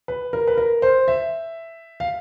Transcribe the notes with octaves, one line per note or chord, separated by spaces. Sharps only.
B4
A#4
B4
A#4
C5
E5
F5